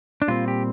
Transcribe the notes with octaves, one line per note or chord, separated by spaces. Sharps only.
D4
A#2 G3 C4 F4
G4